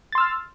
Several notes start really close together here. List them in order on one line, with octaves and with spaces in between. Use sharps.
A6 C6 E6 F6